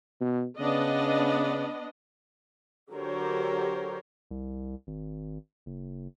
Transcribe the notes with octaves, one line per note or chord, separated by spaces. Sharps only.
B2
C#3 B3 D4 D#5
D3 F#3 G4 A#4 C5 C#5
C2
G#1
F#1